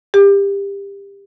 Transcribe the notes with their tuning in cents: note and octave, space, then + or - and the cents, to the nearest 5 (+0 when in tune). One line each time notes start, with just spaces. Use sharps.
G4 +25